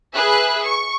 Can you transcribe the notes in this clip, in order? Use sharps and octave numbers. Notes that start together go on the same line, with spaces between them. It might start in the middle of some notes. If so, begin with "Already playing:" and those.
G#4 B4 E5 F#6
C#6